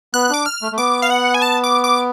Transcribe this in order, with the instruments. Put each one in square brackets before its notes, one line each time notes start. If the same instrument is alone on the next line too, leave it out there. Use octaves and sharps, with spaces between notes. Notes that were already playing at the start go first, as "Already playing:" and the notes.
[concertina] B3 [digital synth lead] F#6
[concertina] D4 [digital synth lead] D6
[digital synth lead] F6
[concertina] A3
A3
[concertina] B3 [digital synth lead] D6
[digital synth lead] F5
F#5
G#5
A5
D6
D6